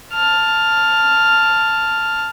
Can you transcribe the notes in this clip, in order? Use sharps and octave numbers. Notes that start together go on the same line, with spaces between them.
A5 F6